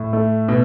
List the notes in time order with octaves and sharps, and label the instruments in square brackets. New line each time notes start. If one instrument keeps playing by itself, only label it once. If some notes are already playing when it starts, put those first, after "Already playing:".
Already playing: [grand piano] A2
A3
B2